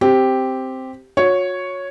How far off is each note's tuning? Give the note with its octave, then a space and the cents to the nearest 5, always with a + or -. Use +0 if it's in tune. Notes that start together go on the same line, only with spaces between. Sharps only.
C4 +0 G4 +0
F#4 -35 C#5 +0